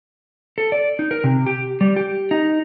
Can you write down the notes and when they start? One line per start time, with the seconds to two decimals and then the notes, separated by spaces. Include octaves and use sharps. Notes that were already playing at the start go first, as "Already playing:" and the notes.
0.58 A4
0.72 D5
0.99 D#4
1.11 A#4
1.24 C3
1.46 G4
1.81 G3
1.96 G4
2.31 D#4